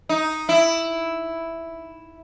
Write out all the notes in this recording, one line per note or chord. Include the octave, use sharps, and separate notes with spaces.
D#4
E4